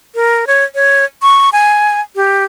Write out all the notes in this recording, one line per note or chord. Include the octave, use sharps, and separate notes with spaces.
A#4
C#5
C#5
C#6
G#5
G4